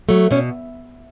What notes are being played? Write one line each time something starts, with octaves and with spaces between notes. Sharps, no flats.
F#3 A3
B2 C#4